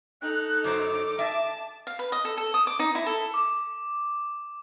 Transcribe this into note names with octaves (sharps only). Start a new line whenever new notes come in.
D#4 A4 F#6
F#2 F#3 C5 D6
D#5 E5 A5
F5
B4
D#5
A4
A4
D#6
D6
D#4
E4
A4
D6